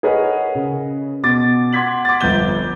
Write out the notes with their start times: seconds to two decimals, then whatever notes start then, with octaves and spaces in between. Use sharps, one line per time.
0.03 G#4 A#4 B4 C#5 D#5 F#5
0.55 C#3
1.23 B2 D6 A6
1.73 F#5 C6 D6 G#6 B6 F#7
2.05 D6 A6
2.21 G1 F2 G6 G7